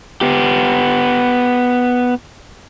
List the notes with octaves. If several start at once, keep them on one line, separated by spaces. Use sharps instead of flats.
B3 G4